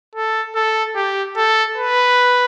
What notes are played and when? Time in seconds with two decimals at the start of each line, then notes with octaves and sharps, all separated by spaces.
0.15 A4
0.55 A4
0.95 G4
1.36 A4
1.78 B4